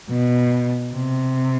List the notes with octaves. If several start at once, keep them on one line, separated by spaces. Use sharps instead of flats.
B2
C3